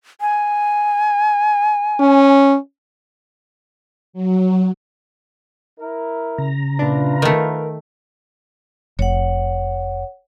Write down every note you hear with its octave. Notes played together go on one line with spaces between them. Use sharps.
G#5
C#4
F#3
E4 A#4
C#3 A#5
A#2 D4 E4 F4 B4
D#3 A3 A#4
F1 C#5 F#5